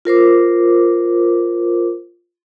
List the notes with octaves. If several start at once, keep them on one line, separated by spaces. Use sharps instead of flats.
F4 A#4 C5 D6